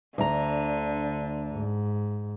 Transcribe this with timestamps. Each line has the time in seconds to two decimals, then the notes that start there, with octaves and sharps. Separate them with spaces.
0.18 D2 D3 A#5
1.52 G#2